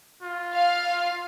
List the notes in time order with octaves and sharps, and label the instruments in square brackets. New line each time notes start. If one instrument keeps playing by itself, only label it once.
[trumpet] F4
[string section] F5